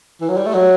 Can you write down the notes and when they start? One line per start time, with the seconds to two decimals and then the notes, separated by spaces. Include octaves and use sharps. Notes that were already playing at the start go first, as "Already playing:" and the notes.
0.21 E3
0.29 F#3
0.37 G3
0.46 A3
0.54 F#3